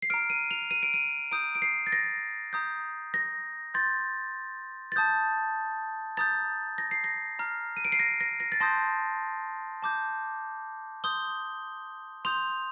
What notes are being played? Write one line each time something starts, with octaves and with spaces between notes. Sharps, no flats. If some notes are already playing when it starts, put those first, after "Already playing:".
C7
A#5 F6 D7
D#7
F7
D#7
D7
D#7
A#5 D#6 G6 D7
D7
C7
A6
A#6
A#5 D#6 G6
A#6
C6 G6 A6
A6
A5 D#6 G6
A#5 D#6 G6 A6
A#6
C7
A#6
A#5 F6
D#7
D7
C7
A#6
A#6
A#6
A6
A5 C6 D#6 G6 A#6
A5 D6 G6
C6 D#6 G6 G7
C6 D#6 G6 F7